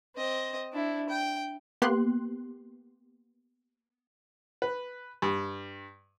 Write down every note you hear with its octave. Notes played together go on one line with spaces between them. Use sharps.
C4 D#5
D4 E4
G5
A#3 B3 G4 C6 F#6
B4
G2